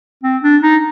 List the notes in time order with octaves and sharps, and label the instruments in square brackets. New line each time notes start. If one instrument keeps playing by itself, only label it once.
[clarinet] C4
D4
D#4